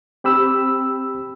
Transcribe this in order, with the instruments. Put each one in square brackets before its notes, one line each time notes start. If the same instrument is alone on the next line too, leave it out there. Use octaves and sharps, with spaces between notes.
[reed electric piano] C4 G4 B5 E6